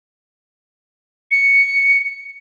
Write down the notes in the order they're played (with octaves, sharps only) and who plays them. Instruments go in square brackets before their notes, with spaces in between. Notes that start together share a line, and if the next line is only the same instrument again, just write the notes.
[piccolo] C#7